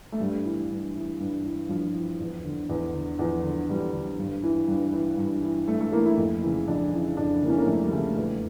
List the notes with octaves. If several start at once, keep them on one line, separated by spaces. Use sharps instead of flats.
A3
G2 G3
E3
G2
E3
G2
E3
G2 F3
E3
E2
D3
E2
D3
E2 F3
D3
E2 G3
D3
G2
E3
G2
E3
G2
E3
G2 A3
A3
E3 A#3
E4
F2
C#3 E3
F2 D4
C#3 E3
F2 D4
C#3 E3 A#3 C#4
A#3
F2 A3
G3
C#3 E3 A3
E2